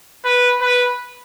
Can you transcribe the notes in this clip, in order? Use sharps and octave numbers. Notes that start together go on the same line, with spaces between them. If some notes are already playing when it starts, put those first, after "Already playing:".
B4
B4